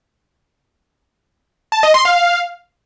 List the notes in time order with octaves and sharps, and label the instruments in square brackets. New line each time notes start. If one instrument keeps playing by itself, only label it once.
[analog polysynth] A5
D#5
C6
F5